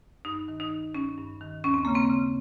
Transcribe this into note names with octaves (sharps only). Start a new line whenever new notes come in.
G2 D#4
D#3
D#4
D#3
G2 C#4
G2
D#3
D#2 C#4
C4
C#3 A#3
C4
C#3